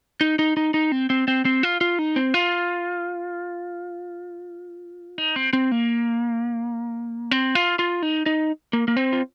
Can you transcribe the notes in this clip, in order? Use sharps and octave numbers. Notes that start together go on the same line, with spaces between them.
D#4
D#4
D#4
D#4
C4
C4
C4
C4
F4
F4
D#4
C4
F4
D#4
C4
C4
A#3
C4
F4
F4
D#4
D#4
A#3
A#3
C4
F4